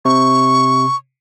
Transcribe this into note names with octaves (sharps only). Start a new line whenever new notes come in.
C3 C#6